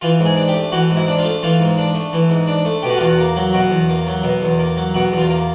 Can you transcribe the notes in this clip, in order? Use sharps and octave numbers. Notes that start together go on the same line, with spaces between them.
E3 F4
G#2
G#4
D4
G4
A3
E3 F#4
G#2
E4
D4
F4
A3
E3 F4
G#2
D4
A3
E3
G#2
D4
A3
B2 G4
F#4
F4
E2 F#4
A#3
F#3
B2 F#4
E2
A#3
F#3
B2
E2
A#3
F#3
B2 F#4
E2
F4
A#3